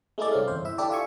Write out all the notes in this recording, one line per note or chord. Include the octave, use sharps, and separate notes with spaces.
G#3 A3 D#4 E4 G#4 D5
C2 C4 C#4 F5
G1 E2 C5
E4 E5
D4 E4 G4 A4 D5
F4 D5 E5 G#5 C#6